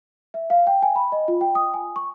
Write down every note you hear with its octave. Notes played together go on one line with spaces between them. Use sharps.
E5
F5
G5
G#5
B5
D#5
F4
G5
D#6
G#5
C#6